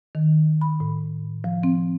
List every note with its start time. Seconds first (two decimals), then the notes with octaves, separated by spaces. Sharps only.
0.15 D#3
0.61 B5
0.80 A2
1.44 F3
1.63 C4